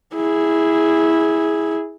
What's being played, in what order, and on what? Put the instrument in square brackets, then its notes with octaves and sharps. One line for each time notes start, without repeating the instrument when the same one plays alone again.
[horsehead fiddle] E4 G#4